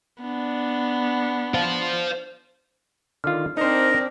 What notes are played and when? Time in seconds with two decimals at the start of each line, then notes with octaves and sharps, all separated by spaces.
0.21 B3 D4
1.54 C5 F5
3.24 D3 D#3 F4 F6
3.57 C4 D4 D#4 A#4 C5 D#5 A#5